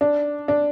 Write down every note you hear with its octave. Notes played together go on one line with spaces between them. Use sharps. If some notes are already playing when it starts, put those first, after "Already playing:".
D4
D4